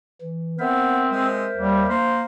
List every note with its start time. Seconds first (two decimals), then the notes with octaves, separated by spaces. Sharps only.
0.22 E3
0.59 B3 C4 A#4 C5 E5
1.10 G#3
1.57 D#2 G3
1.89 A#3 C5